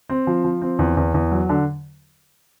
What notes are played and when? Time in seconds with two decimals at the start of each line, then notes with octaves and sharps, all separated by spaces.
0.09 C4
0.27 F3
0.44 F3
0.62 C4
0.79 E2
0.97 E2
1.14 E2
1.32 F#3
1.49 D3